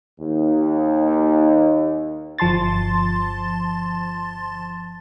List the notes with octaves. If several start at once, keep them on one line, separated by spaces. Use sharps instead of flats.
D#2 D#4
G1 F3 A5 C6 A6